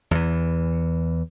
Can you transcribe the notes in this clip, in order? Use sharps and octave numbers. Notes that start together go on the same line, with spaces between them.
E2 E3